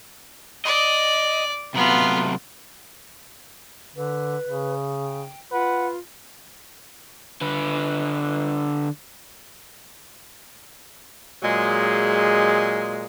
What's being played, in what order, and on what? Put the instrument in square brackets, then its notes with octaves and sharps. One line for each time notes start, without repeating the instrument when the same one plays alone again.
[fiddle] D5 [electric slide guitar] D#5
[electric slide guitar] C3 F#3 A3 [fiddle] B3 F4
[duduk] D3 [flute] B4
[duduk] C#3
[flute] G5
[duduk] F4 [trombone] B4 [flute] F#5
[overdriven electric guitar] D3 B4
[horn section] A#2 F#3 G#3